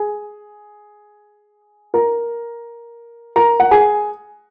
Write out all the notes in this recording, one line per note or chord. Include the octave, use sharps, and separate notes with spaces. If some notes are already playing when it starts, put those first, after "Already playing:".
Already playing: G#4 G#5
A#4 A#5
A#4 A#5
F#5
G#4 G#5